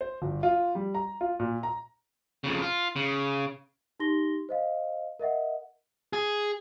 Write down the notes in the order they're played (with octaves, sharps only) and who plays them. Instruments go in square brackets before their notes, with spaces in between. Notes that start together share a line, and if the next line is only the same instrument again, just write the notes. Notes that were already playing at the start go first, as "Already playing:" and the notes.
[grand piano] C5
G1
F4
G3
A#5
F4
A#2
A#5
[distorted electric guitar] F2 C#3
F4
C#3
[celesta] D#4 G4 C6 A#6 G7
C5 D#5 F5
A#4 D#5 E5 F#5
[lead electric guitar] G#4